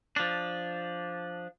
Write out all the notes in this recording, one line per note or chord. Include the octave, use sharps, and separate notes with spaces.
F3 D4